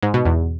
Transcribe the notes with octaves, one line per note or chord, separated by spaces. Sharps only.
G#2
B2
E2